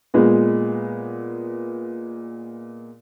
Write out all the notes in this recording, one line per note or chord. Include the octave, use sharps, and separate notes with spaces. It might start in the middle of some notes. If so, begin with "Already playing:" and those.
A#2 G#3 B3